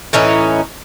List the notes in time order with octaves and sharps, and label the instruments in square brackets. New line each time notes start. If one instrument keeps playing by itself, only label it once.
[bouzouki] A2 E3 C#4 D#4